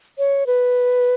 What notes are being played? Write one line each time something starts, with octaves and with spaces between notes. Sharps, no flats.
C#5
B4